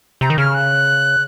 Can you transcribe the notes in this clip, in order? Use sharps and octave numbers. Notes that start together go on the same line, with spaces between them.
C3 A#5
D#3
C#3 F6
F#6